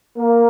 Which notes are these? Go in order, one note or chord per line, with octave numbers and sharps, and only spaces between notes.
A#3